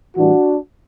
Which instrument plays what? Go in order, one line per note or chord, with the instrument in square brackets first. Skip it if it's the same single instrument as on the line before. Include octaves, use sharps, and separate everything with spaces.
[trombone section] A2 E3 G3 D4 F#4